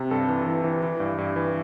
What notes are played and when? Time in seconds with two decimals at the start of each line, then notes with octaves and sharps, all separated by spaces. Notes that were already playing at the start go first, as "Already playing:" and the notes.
Already playing: C3
0.11 G2 A4
0.29 E3
0.46 E3
0.64 E3
0.83 E3
1.00 G2
1.18 G2
1.36 E3